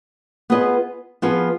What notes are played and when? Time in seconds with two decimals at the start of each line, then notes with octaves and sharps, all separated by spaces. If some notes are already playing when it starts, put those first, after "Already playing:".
0.50 B3 F4 G#4 B4 D#5
1.22 F3 B3 F4 G#4 B4